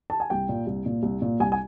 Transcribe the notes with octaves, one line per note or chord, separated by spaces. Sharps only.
A5
G#5
C2 G5
A#2
C2
A#2
C2
A#2
C2 G#5
G#5